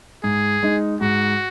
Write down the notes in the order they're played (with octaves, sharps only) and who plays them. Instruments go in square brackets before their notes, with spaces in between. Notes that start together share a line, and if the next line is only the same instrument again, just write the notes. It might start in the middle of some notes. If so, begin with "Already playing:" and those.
[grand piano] G#2 [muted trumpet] G#4
[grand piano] G#3 D#4
[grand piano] G#2 [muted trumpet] F#4